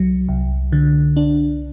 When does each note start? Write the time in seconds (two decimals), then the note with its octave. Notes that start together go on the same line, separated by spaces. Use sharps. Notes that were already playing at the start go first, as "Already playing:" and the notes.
Already playing: C2 F#3
0.29 C2
0.72 D3
1.17 D4